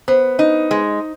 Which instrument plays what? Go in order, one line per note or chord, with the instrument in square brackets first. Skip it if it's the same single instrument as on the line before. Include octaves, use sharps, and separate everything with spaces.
[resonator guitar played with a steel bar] B3 [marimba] C5
[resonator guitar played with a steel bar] D#4
G#3